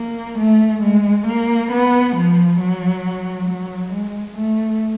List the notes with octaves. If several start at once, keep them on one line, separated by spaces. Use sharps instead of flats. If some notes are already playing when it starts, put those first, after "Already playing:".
Already playing: A#3
A3
G#3
A#3
B3
F3
F#3
F#3
G#3
A3